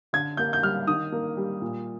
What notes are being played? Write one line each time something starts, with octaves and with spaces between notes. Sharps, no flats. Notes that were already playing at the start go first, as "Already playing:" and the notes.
D3 G#6
A#3 G6
G6
G3 F6
D#3 D#6
A#3
G3
A#2